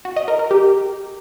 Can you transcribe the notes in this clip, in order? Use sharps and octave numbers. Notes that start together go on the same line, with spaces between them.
F#4
D#5
A#4
A#4
G4